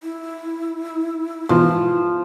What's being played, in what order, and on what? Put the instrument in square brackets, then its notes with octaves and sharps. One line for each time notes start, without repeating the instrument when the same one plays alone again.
[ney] E4
[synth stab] G#2 B2 E3 [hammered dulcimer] F3